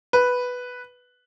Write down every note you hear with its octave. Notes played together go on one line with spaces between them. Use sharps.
B4